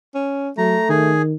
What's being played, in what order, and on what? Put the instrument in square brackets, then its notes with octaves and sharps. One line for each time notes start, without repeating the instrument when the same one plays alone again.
[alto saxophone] C#4
[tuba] F#3 [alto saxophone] A3 [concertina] A#5
[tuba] D#3 [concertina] G#4